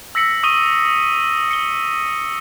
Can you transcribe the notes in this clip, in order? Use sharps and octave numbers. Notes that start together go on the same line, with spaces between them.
E6 A#6 B6 C#7 F#7
C#6 D#6 D#7 G7
C#7 G7